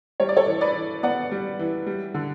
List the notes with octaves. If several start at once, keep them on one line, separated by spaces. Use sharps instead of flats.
G3 C#5
D5
A4 C#5
E3
B4 D5
E3
B3 D5 F#5
G3
E3
G3
D3